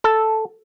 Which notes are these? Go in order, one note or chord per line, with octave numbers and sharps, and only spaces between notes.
A4